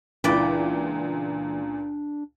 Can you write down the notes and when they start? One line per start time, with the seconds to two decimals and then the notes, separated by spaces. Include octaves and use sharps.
0.24 C#2 A#2 E3 D4 B4 D5 G5